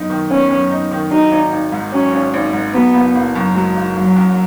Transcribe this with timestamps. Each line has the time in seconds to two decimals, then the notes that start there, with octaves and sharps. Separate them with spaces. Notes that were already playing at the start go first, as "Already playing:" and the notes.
Already playing: F#2 B3 D#4
0.10 D#3
0.30 B3 C#4
0.51 F#2
0.71 D#4
0.91 D#3
1.11 F#3 D#4
1.32 G#1
1.53 G#1
1.72 G#2
1.93 F#3 C#4
2.13 G#1
2.33 G#1
2.53 G#2
2.74 F#3 B3
2.95 F#1
3.15 F#1
3.36 F#2
3.55 F#3 G#3
3.76 F#1
3.96 F#1 F#3
4.16 F#2